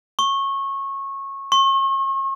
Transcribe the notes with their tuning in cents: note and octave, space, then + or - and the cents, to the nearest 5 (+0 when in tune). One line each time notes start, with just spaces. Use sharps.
C#6 -20
C#6 -40